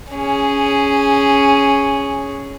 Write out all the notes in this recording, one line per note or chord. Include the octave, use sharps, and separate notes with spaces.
C#4 G#4